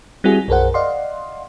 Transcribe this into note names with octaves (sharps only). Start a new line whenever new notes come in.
G3 C4 E4 F#4 G#4
B1 F#2 G#4 A#4 C5 F#5
D5 D#5 F5 F#5 C6